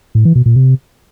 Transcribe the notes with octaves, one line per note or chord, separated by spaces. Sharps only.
A2
E3
B2
A#2
C3